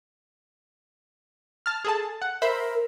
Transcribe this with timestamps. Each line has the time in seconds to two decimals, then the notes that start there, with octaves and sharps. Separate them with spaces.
1.66 A5 F6
1.85 G#4 A4 A5
2.22 F#5
2.42 A#4 C5 E5 B5